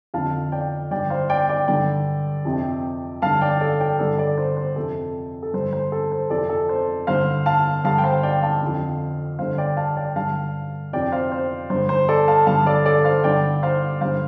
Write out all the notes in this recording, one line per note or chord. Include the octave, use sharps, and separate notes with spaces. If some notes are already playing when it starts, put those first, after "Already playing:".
F2 D3 F5 A5
D5 G5
G2 D3 D5 G5
C5 F5
D5 G5
D5 G5
G2 D3 D5 G5
F2 C3
G2 D3 F5 A5
D5 G5
A4 D5
D5 G5
G2 D3 A4 D5
A4 D5
C5
C5
F2 C3 A4
A4
G2 D3 C5
C5
A4
C5
F2 C3 A4 D5
A4
C5
G2 D3 C5 F5
F5 A5
G2 D3 F5 A5
G5
C5 F5
D5 G5
F5 A5
F2 D3
G2 D3 C5 F5
D5 G5
F5 A5
D5 G5
G2 D3 F5 A5
F2 C3 D5 G5
C5 F5
C5
G2 D3 C5
C5
A4 D5
F5 A5
G2 D3 F5 A5
A4 D5
A4 D5
C5 F5
G2 D3 D5 G5
C5 F5
G2 D3 C5 F5